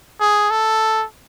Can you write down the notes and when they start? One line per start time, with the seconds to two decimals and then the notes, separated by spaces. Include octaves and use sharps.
0.20 G#4
0.50 A4